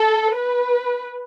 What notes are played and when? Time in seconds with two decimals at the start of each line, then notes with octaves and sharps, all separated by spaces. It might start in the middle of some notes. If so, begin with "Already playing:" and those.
Already playing: A4
0.35 B4